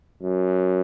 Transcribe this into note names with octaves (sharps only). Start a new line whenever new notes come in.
F#2